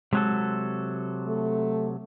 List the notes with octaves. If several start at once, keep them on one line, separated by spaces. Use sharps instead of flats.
C3 F#3 G#3 A4
A3